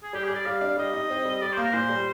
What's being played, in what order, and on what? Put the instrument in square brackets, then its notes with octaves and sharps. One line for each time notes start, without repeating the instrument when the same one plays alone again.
[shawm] G#4
[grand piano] G3 [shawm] G4
[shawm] G#4
[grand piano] G3
[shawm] D5
[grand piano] G3 [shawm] F5
[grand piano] D4
[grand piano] G3 [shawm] D#5
[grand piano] D#4
C4
G3
[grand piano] G3 [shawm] D5
[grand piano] A#3 [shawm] C5
[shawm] A#4
[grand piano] A#2 [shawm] C5
[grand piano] G3